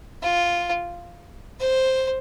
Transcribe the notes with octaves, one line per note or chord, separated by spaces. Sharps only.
F4
C5